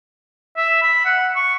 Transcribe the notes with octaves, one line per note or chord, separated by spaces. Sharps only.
E5
B5
F#5
C#6